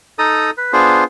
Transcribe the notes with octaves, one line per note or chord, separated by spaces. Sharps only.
D#4 A4 A#5 D#6
B4
B3 D4 F4 G#4 C5